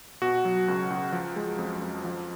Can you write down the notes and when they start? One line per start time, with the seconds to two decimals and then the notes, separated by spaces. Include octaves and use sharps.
0.22 B2 F#4
0.45 F#3
0.68 C#2
0.90 C#2
1.13 F3
1.36 G#3
1.58 F2
1.82 F2
2.04 F3